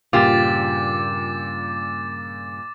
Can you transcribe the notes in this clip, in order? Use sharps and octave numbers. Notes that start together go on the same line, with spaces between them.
G2 A#2 C#3 F4 G4 D6 A6